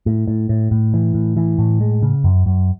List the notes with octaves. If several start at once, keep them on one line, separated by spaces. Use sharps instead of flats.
A2
A2
A2
A2
E3
A2
E3
A2
G#3
C#3
F#2
F#2